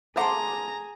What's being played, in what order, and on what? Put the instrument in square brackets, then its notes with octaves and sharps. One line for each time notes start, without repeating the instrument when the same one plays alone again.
[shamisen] A3 C5 F#5 [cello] G#4 [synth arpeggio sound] A5 C6 D6 [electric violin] A#5